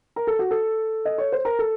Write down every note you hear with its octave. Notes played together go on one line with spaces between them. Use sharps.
A#4
A4
F#4
A4
D#5
C#5
C5
A#4
A4